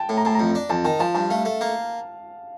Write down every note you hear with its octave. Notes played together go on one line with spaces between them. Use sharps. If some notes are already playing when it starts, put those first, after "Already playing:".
Already playing: G5 A5
A2
A#5
A2 A5
F2 A#5
D4
F2 A5
D#3 A5
F3 A5
G2 A5
A3 F5
A3
A#3